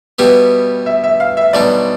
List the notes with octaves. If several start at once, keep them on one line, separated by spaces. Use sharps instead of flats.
B2 G3 B3 E4 G4
E5
E5
F5
E5
B1 B2 G3 D4 D5